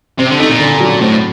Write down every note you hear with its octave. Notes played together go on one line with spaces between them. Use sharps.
C3 C4
D3
A3 D#4
A#2
D3
F#3
A2 C4